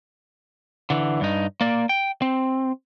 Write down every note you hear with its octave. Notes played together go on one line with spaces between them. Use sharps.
D3 E3
G2 D#4
A#3 D5
G5
C4